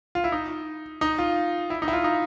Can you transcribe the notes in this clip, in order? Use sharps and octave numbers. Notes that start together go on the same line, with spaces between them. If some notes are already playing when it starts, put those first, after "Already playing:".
F4
E4
D#4
D#4
F4
E4
D#4
E4
F4
D#4